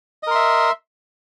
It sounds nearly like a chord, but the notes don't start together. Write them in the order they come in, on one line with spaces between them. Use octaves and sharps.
D#5 A#4 C6 E5